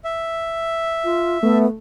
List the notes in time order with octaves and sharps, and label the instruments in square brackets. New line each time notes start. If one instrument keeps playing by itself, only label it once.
[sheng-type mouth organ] E5
[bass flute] F4
[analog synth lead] A3 [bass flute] B3